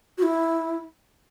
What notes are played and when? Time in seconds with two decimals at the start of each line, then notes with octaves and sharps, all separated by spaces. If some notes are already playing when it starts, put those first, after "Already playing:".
0.18 F#4
0.23 E4